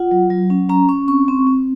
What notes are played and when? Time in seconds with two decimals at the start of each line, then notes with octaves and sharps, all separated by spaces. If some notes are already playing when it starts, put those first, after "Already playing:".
Already playing: F4 F#5
0.11 F#3
0.30 F#3
0.50 C#4
0.69 C#4 A#5
0.89 C#4 C#6
1.08 C4 C#6
1.28 C4
1.47 C4